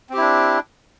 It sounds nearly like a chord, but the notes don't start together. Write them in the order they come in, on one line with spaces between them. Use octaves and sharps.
C4 G4 E4 D4